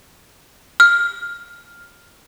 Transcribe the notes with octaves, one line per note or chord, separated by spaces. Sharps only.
F6